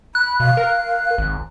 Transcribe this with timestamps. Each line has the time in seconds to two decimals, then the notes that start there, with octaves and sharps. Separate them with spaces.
0.15 B5 F#6
0.40 B2 F5
0.57 A#4
1.18 G#1